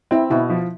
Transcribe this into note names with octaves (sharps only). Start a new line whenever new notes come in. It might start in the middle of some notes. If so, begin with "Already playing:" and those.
C4 E4
B2 E4
F3